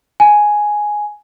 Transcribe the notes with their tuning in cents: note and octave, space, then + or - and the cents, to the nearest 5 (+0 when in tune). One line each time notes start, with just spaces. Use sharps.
G#5 +5